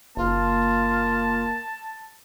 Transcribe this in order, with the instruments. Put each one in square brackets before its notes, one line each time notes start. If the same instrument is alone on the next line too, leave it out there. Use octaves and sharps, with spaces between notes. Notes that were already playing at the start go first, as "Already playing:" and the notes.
[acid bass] F#1 [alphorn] A#3 [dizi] F4 [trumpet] A5